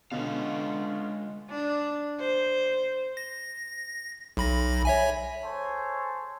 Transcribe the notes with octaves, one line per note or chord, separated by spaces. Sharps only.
B2 D3 G#3 B3 C#4 F4 D#5 F5
D4
C5
A#6
B1 B5 A#6
C#5 E5 G#5
G#4 A4 C5 C#5